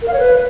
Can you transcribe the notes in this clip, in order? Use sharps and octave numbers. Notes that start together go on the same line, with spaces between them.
A#4
F5
C#5
B4